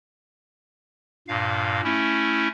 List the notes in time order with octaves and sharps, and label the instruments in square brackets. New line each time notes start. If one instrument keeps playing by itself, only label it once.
[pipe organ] G2 A#2 F5
A3 C#4 E4